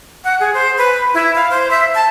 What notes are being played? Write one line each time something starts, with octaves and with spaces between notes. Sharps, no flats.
F#5
G#4
C5
B4
E4
F5
C5
E5
A5